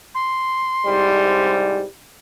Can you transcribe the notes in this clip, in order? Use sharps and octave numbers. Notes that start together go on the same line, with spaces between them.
C6
C2 G#2 G3